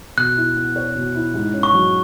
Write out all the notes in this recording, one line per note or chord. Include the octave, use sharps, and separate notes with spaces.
B2 F#6
E4
B3
C#5
B2
E4
G#2
C#4
C#6
F#3